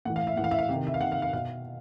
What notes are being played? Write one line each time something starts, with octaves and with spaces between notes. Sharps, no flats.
A2 E3 F#5
F5
E5
A2 E3 F#5
F5
E5
F5
C3 D#3
E5
F5
C3 D#3 F#5
F5
F5
B2 F5